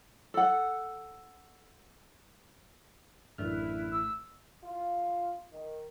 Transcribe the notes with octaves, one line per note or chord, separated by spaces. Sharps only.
A4 F#5
A1 F#2 A3 D4 E4 B4 F6
E6
F4
D#3